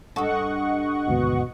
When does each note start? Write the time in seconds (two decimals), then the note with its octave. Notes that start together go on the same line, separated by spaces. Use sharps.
0.16 G2 A4 D#5 F#5 C#6
1.08 G#1 D2 G#2 B2